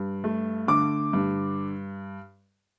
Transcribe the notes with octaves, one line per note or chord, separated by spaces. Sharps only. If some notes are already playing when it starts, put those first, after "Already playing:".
Already playing: G2
A3
D3 D6
G2